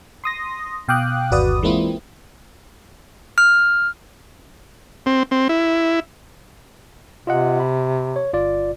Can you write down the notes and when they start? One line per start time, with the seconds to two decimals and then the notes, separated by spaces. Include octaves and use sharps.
0.24 C6 D#6 A#6
0.88 B2 F5 G5 D6 D#6 F#6
1.31 G1 D#2 F#4 B4 D5 D#6
1.62 E3 G#3 A#3 C4 E4 F4
3.38 F6
5.06 C4
5.31 C4
5.49 E4
7.27 C3 F4 D#5 F#5
7.60 B5
8.16 C#5
8.33 G1 F4 D5